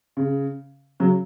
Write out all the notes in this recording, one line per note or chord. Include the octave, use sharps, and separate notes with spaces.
C#3
C#3 F#3